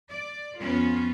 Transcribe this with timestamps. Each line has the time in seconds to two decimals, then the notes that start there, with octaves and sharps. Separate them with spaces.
0.10 D5
0.61 F2 B3 C#4 F4